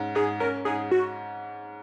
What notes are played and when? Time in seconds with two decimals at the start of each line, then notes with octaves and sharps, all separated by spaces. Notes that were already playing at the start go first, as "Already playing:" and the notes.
Already playing: G#2 C#4
0.15 G#2 G#4
0.40 C#4 A#4
0.65 G#2 G#4
0.91 F#4